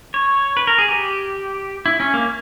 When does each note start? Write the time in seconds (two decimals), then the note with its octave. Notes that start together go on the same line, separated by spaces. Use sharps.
0.14 C#5
0.57 B4
0.67 A#4
0.78 G#4
0.89 G4
1.86 E4
2.00 C#4
2.14 A#3